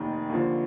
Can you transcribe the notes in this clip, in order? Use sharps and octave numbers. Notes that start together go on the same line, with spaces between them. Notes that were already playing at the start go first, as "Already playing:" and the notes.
Already playing: F1 D#2 D#3
D#2 D3 F3